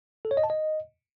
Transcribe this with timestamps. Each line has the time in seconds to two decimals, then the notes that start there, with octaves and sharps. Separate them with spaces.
0.25 A4
0.31 C#5
0.37 D#5
0.44 A5
0.50 D#5